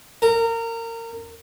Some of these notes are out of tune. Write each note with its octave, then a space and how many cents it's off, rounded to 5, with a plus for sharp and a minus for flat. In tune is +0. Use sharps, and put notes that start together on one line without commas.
A#4 -25